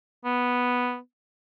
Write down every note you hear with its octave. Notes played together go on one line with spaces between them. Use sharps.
B3